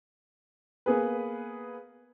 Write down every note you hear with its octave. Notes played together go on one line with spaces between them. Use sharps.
A#3 B3 G#4 B4